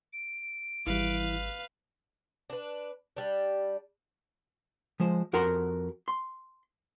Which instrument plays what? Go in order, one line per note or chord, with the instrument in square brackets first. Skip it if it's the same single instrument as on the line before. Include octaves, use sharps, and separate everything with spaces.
[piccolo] D7
[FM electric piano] G#1 G3 [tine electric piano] E3 E4 [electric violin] B4 F5
[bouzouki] D4 B4
G3 D4
[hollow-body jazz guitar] F3 G#3 C5
F2 F#4 A#4 F#5 A#5 C6
C6